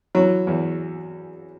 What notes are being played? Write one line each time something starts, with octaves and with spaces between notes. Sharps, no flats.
E3 F#3
E2